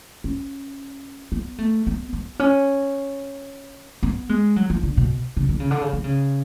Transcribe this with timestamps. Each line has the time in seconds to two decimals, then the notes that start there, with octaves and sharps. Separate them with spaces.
0.24 C#4
1.32 B3
1.58 A3
1.87 B3
2.13 B3
2.40 C#4
4.03 B3
4.29 G#3
4.56 F#3
4.70 F3
4.83 D3
4.97 B2
5.37 C#3
5.49 D3
5.60 C#3
5.71 D3
5.81 C#3
5.93 D3
6.04 C#3